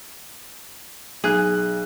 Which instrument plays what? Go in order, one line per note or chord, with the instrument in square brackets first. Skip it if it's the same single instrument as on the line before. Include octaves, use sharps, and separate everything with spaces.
[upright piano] B1 F#6 [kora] G#4